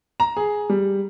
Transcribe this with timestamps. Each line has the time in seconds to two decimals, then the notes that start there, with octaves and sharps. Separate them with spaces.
0.20 A#5
0.37 G#4
0.69 G3